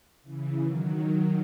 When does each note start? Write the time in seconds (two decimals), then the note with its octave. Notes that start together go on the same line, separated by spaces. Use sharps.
0.23 C#3 E3
0.60 D#3 F#3